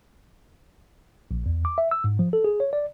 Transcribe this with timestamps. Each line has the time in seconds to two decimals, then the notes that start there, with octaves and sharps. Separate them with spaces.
1.31 A#1
1.46 E2
1.65 D6
1.78 E5
1.91 E6
2.04 G#2
2.19 F3
2.33 A4
2.44 G#4
2.60 C#5
2.73 D5